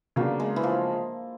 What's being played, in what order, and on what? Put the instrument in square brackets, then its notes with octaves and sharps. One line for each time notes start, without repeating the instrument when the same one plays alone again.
[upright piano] C#3 F#3 B3 D4 [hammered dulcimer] A#3
[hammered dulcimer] G#3
E3
F3